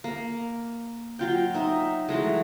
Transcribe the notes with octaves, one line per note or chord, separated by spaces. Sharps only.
A#3
F#3 F4 G5
D#4 E5
E3 F#3 G#3 A3